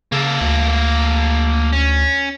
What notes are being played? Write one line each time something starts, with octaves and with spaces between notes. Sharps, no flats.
C#3 A#3 A4
D2
C#4